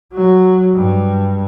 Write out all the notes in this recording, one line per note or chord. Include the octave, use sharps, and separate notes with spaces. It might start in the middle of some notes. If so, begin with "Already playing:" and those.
F#3
G2